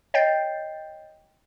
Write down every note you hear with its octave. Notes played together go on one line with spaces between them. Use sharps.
C#5 D#5 G5 G6 A6 C7